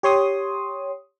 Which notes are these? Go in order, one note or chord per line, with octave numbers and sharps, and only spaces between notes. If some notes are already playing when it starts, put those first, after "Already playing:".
G4 C#5 C6 D#6